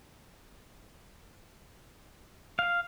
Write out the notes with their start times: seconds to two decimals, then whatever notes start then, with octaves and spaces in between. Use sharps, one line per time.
2.59 F5